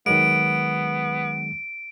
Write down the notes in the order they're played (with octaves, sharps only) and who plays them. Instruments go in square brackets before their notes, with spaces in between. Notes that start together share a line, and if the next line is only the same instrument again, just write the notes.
[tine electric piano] D#3 F#3 G#3 [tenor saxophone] B3 [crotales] D7